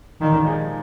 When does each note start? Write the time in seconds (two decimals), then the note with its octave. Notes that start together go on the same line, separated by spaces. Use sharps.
0.21 A#2 D#3
0.45 F3 G#3 D#4 G#4